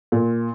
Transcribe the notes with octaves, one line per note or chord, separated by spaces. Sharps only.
A#2